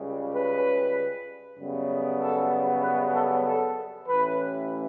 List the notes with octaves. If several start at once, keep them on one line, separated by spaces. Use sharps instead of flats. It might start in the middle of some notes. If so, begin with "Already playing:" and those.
Already playing: C#2 C#3 G3
B4
F#2 C#3 G3 B3
A4
B4
A4
A4
A1 A2 E3 B4